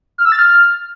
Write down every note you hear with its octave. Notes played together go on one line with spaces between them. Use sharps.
F6
E6
A6
F6